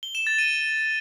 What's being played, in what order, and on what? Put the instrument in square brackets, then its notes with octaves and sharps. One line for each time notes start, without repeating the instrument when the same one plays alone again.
[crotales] G7
E7
A6
D#7